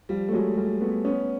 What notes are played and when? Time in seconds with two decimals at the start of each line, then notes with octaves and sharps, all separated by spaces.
0.09 F3 G3
0.28 A3
0.33 F#3 G#3
0.57 G3 A3
0.81 A3 B3
1.05 B3 C#4